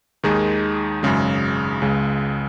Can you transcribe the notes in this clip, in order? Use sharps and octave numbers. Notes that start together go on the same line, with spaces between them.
D#2 D#3 G#3 D#4 G#4
G#1 F#2 C#3 G#3
C#2 C#3 G#3